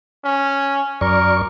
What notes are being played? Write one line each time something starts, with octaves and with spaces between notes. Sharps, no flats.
C#4
F#2 A#4 D5 C#6